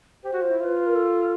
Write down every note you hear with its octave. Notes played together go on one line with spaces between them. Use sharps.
G4 C5
F#4
F4
E4
F4 B4 C5
A#4
A4